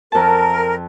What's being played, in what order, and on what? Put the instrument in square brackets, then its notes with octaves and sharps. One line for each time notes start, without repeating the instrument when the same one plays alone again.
[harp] F2 A5 [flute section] A#4